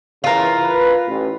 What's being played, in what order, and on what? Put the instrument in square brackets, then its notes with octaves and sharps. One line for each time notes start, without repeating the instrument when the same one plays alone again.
[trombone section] C#3 E3 [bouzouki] F4 A#4
[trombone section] B4
A1